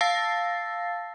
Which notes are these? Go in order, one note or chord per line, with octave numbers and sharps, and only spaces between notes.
F5 A5 E6 A6 A#6 C7